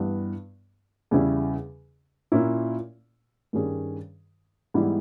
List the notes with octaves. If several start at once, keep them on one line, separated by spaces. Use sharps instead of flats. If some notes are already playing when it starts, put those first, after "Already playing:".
Already playing: G2 E3 G3 B3
E2 C#3 G3 C#4 E4
A#2 A#3 C#4 E4
G2 D#3 G3 C#4 G#4
G#2 E3 G3 B3 E4